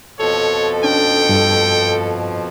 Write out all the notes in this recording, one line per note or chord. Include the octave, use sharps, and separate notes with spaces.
F2 B2 F3 A4 C#5
C#4 D4 G5
G2